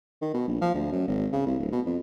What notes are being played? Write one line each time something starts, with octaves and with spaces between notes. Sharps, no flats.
D#3
B2
A#1
F3
D2
F#2
G#1
C#3
C2
D1
B2
F2